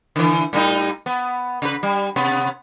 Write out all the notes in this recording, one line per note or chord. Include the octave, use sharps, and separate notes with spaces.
D3 E3
A2 G3 D#4
B3
C#3 B4
G3
C3 B3